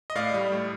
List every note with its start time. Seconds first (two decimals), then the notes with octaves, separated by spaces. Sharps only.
0.10 D#5
0.15 A2 D5 F5
0.34 G3
0.52 A2